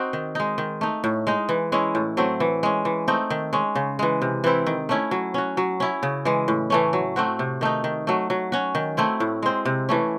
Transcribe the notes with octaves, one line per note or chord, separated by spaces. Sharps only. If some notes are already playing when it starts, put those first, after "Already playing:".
Already playing: C4 D#4 F#4
D#3
G#3 D#4
D#3
A3 D#4
A2
G#3 D#4
E3
G#3 C#4 E4
A2
F#3 A3 C4
E3
G#3 C#4
E3
A3 C4 D#4
D#3
G#3 C#4
C#3
E3 G#3
C3
E3 C4 E4
D#3
A3 C#4 E4
F#3
C#4 F#4
F#3
C#4 E4
C#3
E3 G#3
A2
E3 A3 C#4
F#3
A3 C4 F#4
C3
D#3 A3 D#4
D#3
F#3 A3
F#3
C#4 F#4
D#3
A3 C4 E4
A2
G#3 C4
C3
E3 A3 C#4